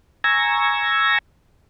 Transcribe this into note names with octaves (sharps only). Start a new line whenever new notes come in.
G#5 A#5 C#6 E6 G#6 A#6